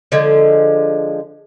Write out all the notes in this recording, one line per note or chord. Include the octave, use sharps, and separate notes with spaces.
D3 F3 G#3